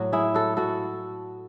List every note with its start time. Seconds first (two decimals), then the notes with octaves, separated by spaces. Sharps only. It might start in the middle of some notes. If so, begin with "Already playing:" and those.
Already playing: A2 F#3 F#4
0.12 E4 G#4
0.34 F#4 A4
0.57 F#4 A4